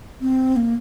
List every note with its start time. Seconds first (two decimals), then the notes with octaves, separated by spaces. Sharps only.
0.21 C4
0.56 A#3